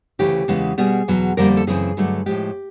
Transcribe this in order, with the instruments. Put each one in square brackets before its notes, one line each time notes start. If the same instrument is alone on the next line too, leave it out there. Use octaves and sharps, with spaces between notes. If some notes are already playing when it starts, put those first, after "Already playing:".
[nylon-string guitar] D2 C#3 E3 A3 G4
E2 C#3 E3 G#3 B3
B2 G3 B3 G#4
E2 B2 F#3
F2 D3 G3 A#3 A#4
A4
F#2 C#3 E3 A3 C4 G#4
G2 D3 F#3 A3
A2 F3 G#3 G4